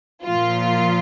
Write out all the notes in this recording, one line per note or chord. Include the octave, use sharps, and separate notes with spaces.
A#2 F3 F4